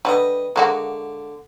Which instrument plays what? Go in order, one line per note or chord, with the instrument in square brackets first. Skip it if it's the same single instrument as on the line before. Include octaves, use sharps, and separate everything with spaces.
[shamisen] D3 G3 [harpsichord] B4 D#5
[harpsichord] D3 [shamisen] G#3 A#3 F#4